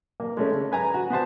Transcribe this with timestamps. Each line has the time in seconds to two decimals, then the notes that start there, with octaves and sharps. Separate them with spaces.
0.20 A#3
0.37 G#3 A3 C#4
0.52 C#3
0.72 B4 G#5 A#5
0.94 F#4
1.10 B3 F#4 C5 A5